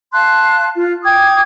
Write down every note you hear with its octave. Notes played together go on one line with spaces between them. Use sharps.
F5 A5 C6 F#6
F4
G5 D6 D#6 G#6